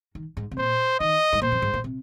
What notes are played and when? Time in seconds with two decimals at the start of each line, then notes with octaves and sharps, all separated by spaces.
0.15 D#3
0.37 G#2
0.51 C3
0.58 A#2 C5
1.00 D#3 D#5
1.33 G#2
1.41 A#2 C5
1.52 F2
1.62 G#2
1.74 A#2
1.84 C3